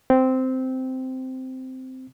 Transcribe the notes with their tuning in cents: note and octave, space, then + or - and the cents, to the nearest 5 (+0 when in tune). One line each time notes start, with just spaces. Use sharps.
C4 -10